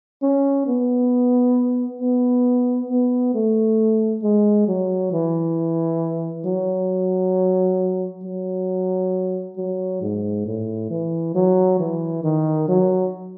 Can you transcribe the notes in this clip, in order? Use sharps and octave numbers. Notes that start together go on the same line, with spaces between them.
C#4
B3
B3
B3
A3
G#3
F#3
E3
F#3
F#3
F#3
G#2
A2
E3
F#3
E3
D#3
F#3